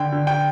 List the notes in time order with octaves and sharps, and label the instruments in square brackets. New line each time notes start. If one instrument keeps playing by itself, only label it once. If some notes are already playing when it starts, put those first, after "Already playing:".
Already playing: [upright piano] D3 G5
D3
G5